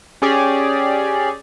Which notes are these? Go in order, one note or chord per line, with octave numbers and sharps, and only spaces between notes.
C#4 G4 G#4 D5